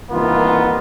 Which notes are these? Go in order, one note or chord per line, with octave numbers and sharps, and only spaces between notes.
C2 D#3 E3 A#3 B3 F4